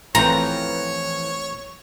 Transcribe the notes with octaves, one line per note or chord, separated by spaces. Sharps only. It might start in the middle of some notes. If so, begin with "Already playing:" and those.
A1 E3 F3 C4 F4 C#5 G5 A#5